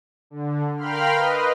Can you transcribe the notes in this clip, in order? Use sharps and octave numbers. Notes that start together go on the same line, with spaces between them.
D3
A#4 F5 G5 B5 C6 F6
B4 D#5